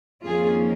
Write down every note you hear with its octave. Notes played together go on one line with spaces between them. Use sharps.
F2 D#3 A#3 C#4 F4 G#4